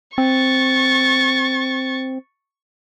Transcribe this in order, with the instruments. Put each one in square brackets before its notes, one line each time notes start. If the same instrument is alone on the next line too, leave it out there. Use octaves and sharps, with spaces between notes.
[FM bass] C4 [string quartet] C#6 A6